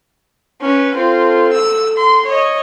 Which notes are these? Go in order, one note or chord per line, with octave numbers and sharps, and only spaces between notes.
C#4 B4
C4 F4 A4
E6
C6
C#5 D#5